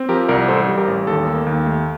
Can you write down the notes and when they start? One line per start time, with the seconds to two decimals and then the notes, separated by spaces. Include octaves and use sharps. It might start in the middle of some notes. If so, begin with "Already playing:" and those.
Already playing: C4
0.09 F3 G4 A#4
0.29 C2 A#4 D5
0.48 A1 A4 C5
0.68 G3
0.78 G4 A#4
0.88 A1
1.07 D#2 A4
1.27 A#3
1.47 D#2
1.66 A3